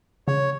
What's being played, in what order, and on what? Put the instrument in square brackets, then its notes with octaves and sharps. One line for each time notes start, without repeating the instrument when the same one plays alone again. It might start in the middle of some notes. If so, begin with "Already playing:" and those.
[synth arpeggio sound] C#3 [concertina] C#5